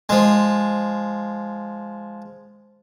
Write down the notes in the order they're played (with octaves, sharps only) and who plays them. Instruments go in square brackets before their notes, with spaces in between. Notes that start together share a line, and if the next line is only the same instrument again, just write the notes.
[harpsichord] F3 G#3